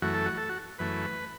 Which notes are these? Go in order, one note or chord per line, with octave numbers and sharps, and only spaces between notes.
F#2 E3 A3 F#4
A4
F#4
A4
F#4
F#2 E3 A3 B4